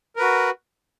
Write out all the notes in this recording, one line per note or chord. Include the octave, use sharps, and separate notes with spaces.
F#4 A#4 B4